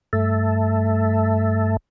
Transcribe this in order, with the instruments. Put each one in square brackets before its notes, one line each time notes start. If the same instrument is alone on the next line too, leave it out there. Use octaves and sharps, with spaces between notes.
[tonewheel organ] G2 A3 E5 A5